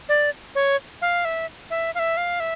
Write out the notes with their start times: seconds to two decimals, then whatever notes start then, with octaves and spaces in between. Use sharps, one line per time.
0.09 D5
0.55 C#5
1.02 F5
1.25 E5
1.70 E5
1.95 F5
1.99 E5
2.17 F5
2.40 E5